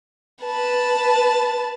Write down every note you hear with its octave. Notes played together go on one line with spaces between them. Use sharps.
B4 A5